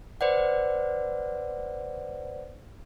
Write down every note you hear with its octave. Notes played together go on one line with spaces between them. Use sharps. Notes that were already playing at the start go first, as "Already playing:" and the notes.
B4 C5 D5 F#5